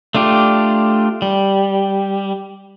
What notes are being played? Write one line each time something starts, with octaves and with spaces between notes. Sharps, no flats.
A3 D4 F4 G4
G3